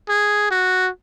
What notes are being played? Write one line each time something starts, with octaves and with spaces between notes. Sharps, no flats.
G#4
F#4